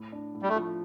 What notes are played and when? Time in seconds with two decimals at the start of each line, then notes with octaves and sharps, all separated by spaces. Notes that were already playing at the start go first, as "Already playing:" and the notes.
Already playing: A2
0.12 D4
0.35 A2
0.42 G3
0.49 A3
0.56 F3